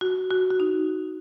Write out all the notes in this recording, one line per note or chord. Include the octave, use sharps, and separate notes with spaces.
F#4
F#4
F#4
D#4